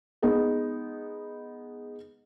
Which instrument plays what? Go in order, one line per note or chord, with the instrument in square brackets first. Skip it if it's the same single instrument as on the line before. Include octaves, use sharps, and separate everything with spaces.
[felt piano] G#3 B3 D#4